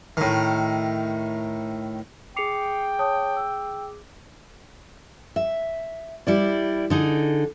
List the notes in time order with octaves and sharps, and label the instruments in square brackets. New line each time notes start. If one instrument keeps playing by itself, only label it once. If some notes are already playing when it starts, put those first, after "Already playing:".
[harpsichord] A2 D#3
[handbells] G#4 D6 [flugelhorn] G5 [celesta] C7 C#7 F7
[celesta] C#5 A5 D#6
E6
[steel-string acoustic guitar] E5
G3 E4 D5
D3 D#4 G#4